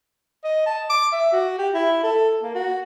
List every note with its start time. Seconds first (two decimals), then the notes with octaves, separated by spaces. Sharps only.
0.44 D#5
0.66 A5
0.90 D6
1.12 E5
1.33 F#4
1.58 G4
1.74 E4
2.03 A4
2.43 A#3
2.55 F#4